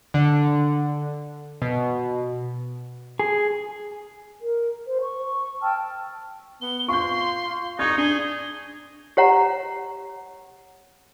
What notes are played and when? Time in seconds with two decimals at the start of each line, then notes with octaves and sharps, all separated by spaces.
0.14 D3
1.62 B2
3.19 G#4
4.39 A#4
4.87 C5
5.01 C#6
5.63 G5 A5 E6 F6
6.61 B3 G7
6.88 F4 C6 C#6 G6
7.79 D#4 D5 C#6 G#6
7.97 D4 G#4 G7
9.17 G4 C#5 F#5 A#5